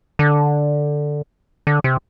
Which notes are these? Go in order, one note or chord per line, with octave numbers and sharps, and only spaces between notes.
D3
D3
C3